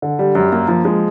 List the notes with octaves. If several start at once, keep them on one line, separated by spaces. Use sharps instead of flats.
D3
G3
F#2
A#3
F3
G#3